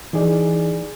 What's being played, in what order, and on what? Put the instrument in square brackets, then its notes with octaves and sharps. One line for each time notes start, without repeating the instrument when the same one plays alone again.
[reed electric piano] E3 D#4 G#4 D5